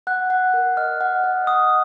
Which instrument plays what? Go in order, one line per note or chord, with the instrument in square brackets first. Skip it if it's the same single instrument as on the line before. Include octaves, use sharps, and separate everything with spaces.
[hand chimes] F#5 [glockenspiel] F#6
[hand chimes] F#5
A#4
[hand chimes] D#5 [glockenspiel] F6
[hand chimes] F#5
D#5
[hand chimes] F#5 [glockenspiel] D#6